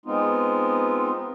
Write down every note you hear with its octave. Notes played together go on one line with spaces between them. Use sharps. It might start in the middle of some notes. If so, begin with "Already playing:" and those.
G#3 B3 C4 D#4 F4